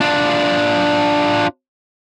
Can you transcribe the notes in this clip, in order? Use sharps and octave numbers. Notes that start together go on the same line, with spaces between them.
D4 F4